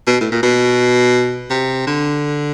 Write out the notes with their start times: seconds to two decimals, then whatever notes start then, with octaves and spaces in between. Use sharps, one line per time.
0.07 B2
0.21 A2
0.32 A#2
0.43 B2
1.50 C3
1.87 D3